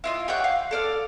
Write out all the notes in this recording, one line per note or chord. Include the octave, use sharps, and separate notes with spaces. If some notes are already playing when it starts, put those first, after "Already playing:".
E4 F4 D#5
G4 C#5 F#5 G6
F5
A4 D5 F5